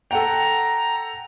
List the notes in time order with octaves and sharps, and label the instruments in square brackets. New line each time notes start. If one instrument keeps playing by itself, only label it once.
[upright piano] A4 F#5 G5 [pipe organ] A#5 A#6